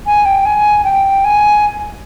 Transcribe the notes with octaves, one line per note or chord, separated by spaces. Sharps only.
G#5
G5
G#5
G5
G#5